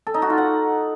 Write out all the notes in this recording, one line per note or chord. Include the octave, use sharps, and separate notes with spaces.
A4
D#4
F#4
F4
F#5